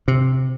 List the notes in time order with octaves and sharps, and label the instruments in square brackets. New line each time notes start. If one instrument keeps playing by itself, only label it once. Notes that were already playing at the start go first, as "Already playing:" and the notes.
[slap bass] C3